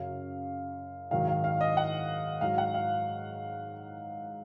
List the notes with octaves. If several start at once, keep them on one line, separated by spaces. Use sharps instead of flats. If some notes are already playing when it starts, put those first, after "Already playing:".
Already playing: F#2 C#3 F#3 F5
G#2 D#3 F#3 F5
F5
F5
D#5
F#5
G#2 F#3 F5
F#5
F5